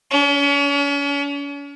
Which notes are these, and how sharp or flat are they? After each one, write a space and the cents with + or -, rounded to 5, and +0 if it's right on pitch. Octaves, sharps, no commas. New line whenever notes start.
C#4 +40